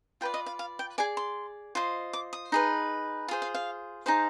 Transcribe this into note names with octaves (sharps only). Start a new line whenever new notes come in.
F4 B4 D5 G5
D#5
F5
F5
G5
G#4 D5 G#5
C6
F4 C5 D#5
D6
D#6
D#4 G#4 B4
F4 G#4 C5
F5
F5
D#4 G#4 C5 F5